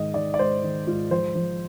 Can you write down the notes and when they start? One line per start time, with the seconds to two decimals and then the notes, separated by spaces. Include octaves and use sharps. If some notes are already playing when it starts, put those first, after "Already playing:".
Already playing: G#2 D#3 D#5
0.14 D#3 D5
0.34 D5
0.39 G#2 C5
0.63 D#3
0.87 G#2 F4
1.11 F3 C5
1.35 F3